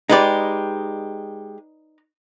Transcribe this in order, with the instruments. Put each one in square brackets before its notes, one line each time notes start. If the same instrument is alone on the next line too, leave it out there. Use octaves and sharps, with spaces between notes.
[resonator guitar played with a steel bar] G#3 G4 [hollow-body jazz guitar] D#4 B4 D5